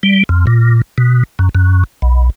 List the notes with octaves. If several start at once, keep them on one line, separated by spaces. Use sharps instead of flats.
G3
F2
A#2
B2
F#2
F#2
B1